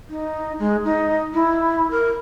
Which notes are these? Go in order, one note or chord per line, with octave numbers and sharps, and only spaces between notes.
D#4
G#3
D#4
E4
A#4